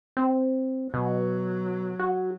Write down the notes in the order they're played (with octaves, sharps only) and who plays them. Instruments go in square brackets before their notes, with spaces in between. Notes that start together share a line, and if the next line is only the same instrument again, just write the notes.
[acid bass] C4
[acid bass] B2 [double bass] F#3
[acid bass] F#4